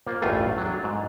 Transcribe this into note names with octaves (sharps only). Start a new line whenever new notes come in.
A#3 F4 C5
A1 E2 G2 A3 F4 G#4
F#3 D4
G#2